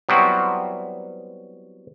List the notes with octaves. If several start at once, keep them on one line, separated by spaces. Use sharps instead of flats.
F#3 G3 B3 C4 E4 F#4